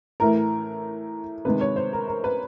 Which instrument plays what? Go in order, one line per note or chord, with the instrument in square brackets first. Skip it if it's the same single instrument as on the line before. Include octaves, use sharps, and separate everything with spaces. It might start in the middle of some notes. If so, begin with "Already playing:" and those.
[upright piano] A2 E3 A3 A#4
C3 D#3 G#3 B4
C#5
C5
A#4
A#4
B4